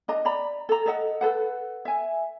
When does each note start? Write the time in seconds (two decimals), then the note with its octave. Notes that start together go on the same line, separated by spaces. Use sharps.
0.08 D4 D#5 A#5
0.25 D5 A#5 B5
0.69 A4 A#5
0.86 A4 D#5 F#5
1.21 A4 B4 F#5
1.85 E5 G#5